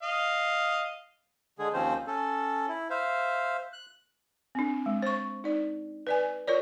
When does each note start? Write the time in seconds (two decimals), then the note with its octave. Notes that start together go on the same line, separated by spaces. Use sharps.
0.03 D#5 F5
1.59 D3 G#3 G#4
1.73 D#2 F3 C4 C#4 C5
2.07 C#4 A4
2.69 E4
2.90 C5 E5 F5
3.73 F#6
4.55 C4 D4
4.86 G#3
5.02 C5 C#6
5.44 D#4 D5
6.07 B4 D5 G#5
6.47 F4 A#4 C#5 D5